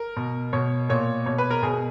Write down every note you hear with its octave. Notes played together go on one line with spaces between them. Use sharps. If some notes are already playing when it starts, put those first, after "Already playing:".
Already playing: A#4
B2
B2 C#5
A#2 C#5
B2 C#5
B4
A#4
B2 G#4